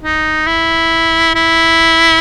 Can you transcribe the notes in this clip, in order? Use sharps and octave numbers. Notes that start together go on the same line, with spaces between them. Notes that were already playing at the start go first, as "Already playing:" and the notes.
D#4
E4
E4